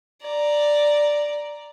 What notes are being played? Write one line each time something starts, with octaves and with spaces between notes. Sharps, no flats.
D5 A#5